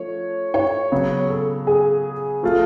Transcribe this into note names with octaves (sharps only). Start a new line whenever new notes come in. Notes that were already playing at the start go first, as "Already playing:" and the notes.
Already playing: F3 A3 C#4 C#5
C#5
C#3 F#3 B3
A4
G#4
F3 A3 F4